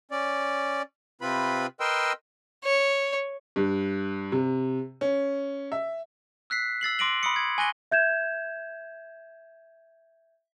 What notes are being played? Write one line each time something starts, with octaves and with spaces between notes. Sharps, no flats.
C#4 D5
C3 C4 F4 B4 B5
A#4 B4 D#5 G5 C6 E6
C#5
G2
C3
C#4
E5
E6 F#6 B6 C7
E6 A6 C7 F#7
C6 D6 A#6 D7 D#7 F#7
B5 C6 D#6 C#7
G#6
G#5 C#6 F#6 A#6 D#7 G7
E5 G6 G#6 E7